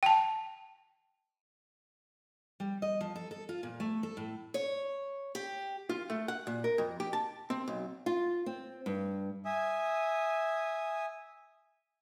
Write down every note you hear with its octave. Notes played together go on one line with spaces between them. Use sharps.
G5 A5
G3
D#5
F3
A4
A4
F4
A#2
A3
A4
A2
C#5
G4
F4
A3
F#5
A#2
A#4
F2
G4
A5
C4
B1
F4
C4
G2
E5 G#5 D#6